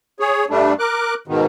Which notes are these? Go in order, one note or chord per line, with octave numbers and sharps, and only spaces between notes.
G#4 C#5
G2 G3 A3 D4
A#4 D6 F#6
G#2 B2 D#3